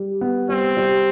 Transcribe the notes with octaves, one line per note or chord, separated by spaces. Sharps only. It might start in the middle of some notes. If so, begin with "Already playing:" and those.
Already playing: G3
B3
G3 C4
G3